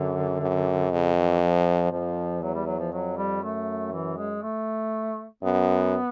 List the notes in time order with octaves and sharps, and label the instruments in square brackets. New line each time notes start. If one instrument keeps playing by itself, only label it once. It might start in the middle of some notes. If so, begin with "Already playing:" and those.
Already playing: [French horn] F#2 [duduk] D3
[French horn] F#2
[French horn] F2 [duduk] C#3
[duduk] E3
F3
[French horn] F2 [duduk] F3
[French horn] E2 [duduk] F#3
[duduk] G3
F#3
F3
[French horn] F2 [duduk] F#3
[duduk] G3
[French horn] F#2 [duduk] A3
[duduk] E3
G#3
A3
[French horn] F#2 [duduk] B3